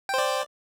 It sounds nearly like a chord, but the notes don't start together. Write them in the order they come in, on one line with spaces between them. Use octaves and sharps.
G5 C5 D5